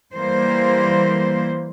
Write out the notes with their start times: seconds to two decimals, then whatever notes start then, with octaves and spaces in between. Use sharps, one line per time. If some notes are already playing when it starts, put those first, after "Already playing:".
0.13 E3 G3 A#3 C5